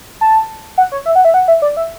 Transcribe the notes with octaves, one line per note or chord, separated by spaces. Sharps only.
A5
F#5
C#5
E5
F#5
E5
F#5
E5
D5
E5